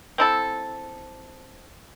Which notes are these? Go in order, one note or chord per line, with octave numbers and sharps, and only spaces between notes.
C4 E4 A4